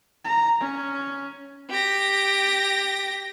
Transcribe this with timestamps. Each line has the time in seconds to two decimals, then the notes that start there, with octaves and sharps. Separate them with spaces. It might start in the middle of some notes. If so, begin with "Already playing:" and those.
0.25 A#5
0.61 C#4
1.70 G4 A#6